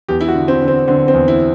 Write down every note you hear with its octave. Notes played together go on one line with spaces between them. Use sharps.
E2 G4
E4
F#4
D3
C4
D3
C4
D3 C4
C4
E2
E4